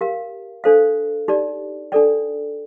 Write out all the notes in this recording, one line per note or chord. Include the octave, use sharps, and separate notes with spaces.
G4 A#4 F5
D4 A4 C5 F5
D#4 G4 D5
D4 A4 D5 G5